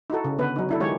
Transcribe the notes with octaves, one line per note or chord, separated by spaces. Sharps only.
D#4 E4 F#4 A4
C#3
D3 B3 B4
F#3 D#4
D4 E4 A4
D#3 G#3 G4 C#5